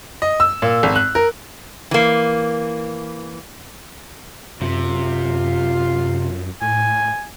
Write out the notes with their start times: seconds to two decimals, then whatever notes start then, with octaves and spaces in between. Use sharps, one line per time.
0.22 D#5
0.40 E6
0.62 A#2
0.83 G#1
0.95 F#6
1.15 A#4
1.91 E3 A#3
4.61 F#2 C3 F4
6.62 A2 G#5